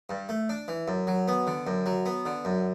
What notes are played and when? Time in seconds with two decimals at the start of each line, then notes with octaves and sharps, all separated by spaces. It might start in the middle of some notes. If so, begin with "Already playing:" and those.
0.10 G2
0.29 A3
0.49 D4
0.68 E3
0.88 F#2
1.07 F#3
1.28 B3
1.47 D3
1.67 F#2
1.86 F#3
2.06 B3
2.26 D3
2.45 F#2